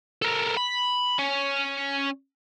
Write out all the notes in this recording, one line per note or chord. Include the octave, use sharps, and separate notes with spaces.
A4 A#4
B5
C#4